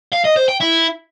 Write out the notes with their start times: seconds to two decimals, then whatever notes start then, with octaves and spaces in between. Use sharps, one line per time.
0.13 F5
0.25 D#5
0.37 C5
0.49 G5
0.61 E4